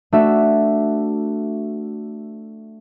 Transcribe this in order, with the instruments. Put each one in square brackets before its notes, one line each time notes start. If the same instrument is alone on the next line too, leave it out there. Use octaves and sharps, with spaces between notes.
[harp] A3 D4 F#4 E5